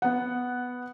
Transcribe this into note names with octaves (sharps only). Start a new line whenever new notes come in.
B3 F#5